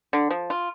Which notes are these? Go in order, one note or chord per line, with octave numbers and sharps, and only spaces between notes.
D3
F3
F4